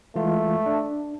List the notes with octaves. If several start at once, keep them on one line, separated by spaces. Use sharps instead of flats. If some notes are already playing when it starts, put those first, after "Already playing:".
E3 G#3 A3 F4
D4